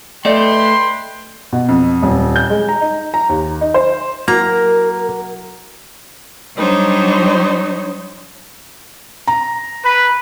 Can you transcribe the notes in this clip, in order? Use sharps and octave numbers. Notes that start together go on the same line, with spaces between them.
A3 B4 D5 D#5 G5 C6
B2
F2
D#1
G6
G#3
A#5
D#4
A#5
D#2
D#4
C5
F#3 A#3 E4 F#4 A#4 A#5
F#3 G3 D4 D#4 C5 C#5
A#5
B4